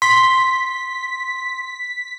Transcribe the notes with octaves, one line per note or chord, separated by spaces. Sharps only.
C6 B6